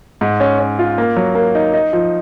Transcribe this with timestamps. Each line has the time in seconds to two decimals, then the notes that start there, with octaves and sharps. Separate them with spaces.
0.21 G#2
0.40 C#4
0.59 C#4
0.79 F4
0.98 A#3
1.17 F#3
1.35 A#3
1.55 D#4
1.74 D#4
1.93 F3